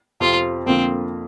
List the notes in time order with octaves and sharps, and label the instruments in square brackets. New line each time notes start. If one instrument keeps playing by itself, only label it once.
[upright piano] F2 C3 F3 C4 [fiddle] F4
[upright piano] F2 D3 A#3 F4 [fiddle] C4